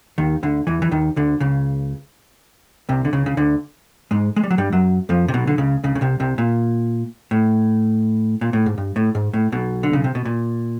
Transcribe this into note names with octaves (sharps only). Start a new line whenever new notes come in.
D#2 D#3
D2 D3
E2 E3
E3
D#2 D#3
D2 D3
C#2 C#3
C2 C3
D3
C#2 C#3
C#3
D2 D3
G#2 G#3
G#3
G3
F#3
G2 G3
F#2 F#3
F2 F3
C3
B1 B2
D3
C#2 C#3
C#2 C#3
C#3
C2 C3
C2 C3
A#2
A2
A#2
A2
G#2
G2
A2
G#2
A2
B1 B2
D3
C#3
C3
B2
A#2